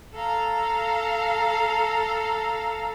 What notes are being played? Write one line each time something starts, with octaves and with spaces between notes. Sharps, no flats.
A4 F5 A#5